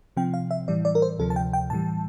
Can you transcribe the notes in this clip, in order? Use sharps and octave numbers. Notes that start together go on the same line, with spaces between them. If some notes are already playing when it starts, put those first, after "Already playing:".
C3 F3 C4 G5
F5
E5
A2 E3 G3 D5
D5
A#4
C5
D2 C3 F3 A4
A5
G5
G5
A2 E3 G3 A5